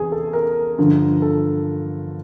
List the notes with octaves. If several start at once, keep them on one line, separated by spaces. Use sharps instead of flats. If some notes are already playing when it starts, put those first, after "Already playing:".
Already playing: E2 C3 G#4
A4
A#4
G2 D3 F3
A4